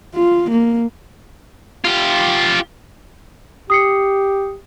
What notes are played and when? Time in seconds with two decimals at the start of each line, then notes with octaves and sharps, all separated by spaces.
0.15 F4
0.51 A#3
1.85 F4 G4
3.70 G4 D#6 C7 C#7